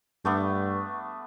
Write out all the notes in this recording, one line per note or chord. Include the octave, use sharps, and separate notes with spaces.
G2 A3 B3 D4